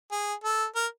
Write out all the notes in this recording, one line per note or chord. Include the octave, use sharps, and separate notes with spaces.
G#4
A4
A#4